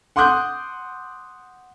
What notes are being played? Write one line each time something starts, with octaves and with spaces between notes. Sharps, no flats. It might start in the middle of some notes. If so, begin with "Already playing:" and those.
F#5 C6 D6 D#6 F#6 G6